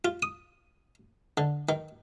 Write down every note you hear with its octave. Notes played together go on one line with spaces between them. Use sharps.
F4
D#6
D3
D#3